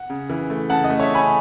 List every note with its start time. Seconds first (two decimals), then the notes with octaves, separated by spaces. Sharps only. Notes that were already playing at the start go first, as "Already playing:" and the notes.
Already playing: F#5
0.10 C#3
0.30 E3
0.50 A3
0.69 C#3 F#5 A5
0.84 D#5
0.90 A3
1.00 C#5 E5
1.10 C#4
1.15 G#5 B5